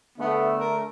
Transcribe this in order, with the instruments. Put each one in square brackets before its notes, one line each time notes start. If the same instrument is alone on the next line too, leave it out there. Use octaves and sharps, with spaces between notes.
[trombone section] D3 A3 [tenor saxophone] B3
[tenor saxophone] A#4